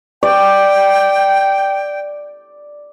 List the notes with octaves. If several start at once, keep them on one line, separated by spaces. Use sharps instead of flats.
D5 G5